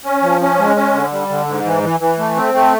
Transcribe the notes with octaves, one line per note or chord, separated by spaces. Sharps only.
C#4
F3
C#4
G#3
C#4
D3
G3
D3
G#2
E3
E3
E3
A3
C4
A3